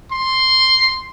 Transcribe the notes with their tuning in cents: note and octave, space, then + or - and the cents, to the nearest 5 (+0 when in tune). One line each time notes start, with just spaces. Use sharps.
C6 +5